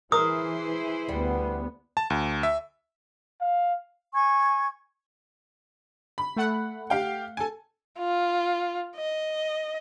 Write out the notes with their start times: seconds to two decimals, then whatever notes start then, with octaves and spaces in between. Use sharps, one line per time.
0.12 E3 E4 G#4 A#4 C5 D#6
1.09 D2 G3 B3
1.97 A5
2.10 D2
2.43 E5
3.41 F5
4.14 G#5 C#6 G#6
6.18 B5
6.36 A3 F#5
6.90 G4 F5 G5
7.37 A4 G#5
7.99 F4
8.97 D#5